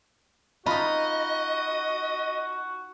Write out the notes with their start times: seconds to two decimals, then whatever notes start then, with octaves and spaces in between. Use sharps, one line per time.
0.66 D#4 F4 F#4 D#5 B5